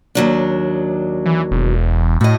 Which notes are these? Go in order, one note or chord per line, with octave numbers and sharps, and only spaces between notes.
D#2 F#3 D4
E3
E1
A2 F#4 D#5